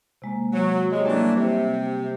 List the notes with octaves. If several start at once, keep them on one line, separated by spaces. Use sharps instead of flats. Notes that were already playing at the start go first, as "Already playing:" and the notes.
C3 G#3 A#3
F#3
C3 G#3 C#5
E3 F#3 G3 A3 A#3 D4
C3